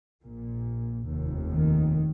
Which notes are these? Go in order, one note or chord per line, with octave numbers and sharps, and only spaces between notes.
A#1 A#2
F1 D#2
D#3